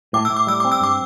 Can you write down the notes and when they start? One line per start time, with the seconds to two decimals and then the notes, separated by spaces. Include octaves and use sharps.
0.13 A2 D6
0.25 A2 E6
0.37 D6
0.47 G3 E6
0.60 C4 D6
0.72 E6
0.81 G2 D6